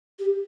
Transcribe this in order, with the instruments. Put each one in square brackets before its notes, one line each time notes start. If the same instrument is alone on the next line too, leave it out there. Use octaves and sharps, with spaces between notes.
[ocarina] G4